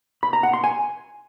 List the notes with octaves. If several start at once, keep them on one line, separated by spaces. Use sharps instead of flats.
B5
A#5
F#5
C6
G#5